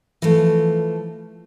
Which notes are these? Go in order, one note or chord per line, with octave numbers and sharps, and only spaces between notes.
E3 F3 A3